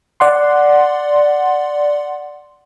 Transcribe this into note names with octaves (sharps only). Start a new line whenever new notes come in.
D5 F#5 C6